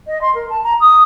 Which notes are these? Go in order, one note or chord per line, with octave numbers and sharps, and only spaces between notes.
D#5
C6
A#4
A5
A#5
D#6